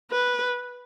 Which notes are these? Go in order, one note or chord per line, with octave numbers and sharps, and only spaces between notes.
B4